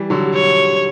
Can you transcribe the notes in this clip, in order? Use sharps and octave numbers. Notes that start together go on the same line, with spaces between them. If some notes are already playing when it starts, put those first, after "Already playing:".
Already playing: E3 G3
D3 F#3
C#5